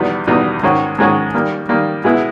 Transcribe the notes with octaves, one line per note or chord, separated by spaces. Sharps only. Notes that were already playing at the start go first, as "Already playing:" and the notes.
Already playing: E2 B2 G3 B3 D#4
E2 B2 G3 B3 D#4
G#2 D#3 G#3 C#4 F#4
G#2 D#3 G#3 C#4 F#4
D#3 G3 A#3
D#3 G3 A#3
B2 G#3 B3 E4 G#4